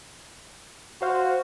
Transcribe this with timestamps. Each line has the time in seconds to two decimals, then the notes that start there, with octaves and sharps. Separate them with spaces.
1.02 F#4 C5 F5